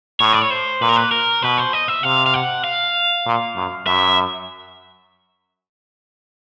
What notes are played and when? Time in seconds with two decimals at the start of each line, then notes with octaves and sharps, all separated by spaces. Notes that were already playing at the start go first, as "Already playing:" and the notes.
0.20 A2 C#5
0.33 D5
0.42 C#5
0.50 C5
0.81 A#2 B4
0.89 A#4
0.96 B4
1.11 A#4
1.42 B2 B4
1.58 C5
1.73 D#5
1.88 E5
2.03 C3 F5
2.26 F5
2.34 F#5
2.64 F5
3.26 A#2
3.56 F#2
3.86 F#2 E5